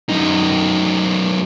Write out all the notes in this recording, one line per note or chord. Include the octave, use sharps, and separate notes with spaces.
F#2 D#4